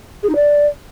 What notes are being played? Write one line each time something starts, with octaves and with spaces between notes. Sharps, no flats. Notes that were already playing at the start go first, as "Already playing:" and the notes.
G#4
D#4
D5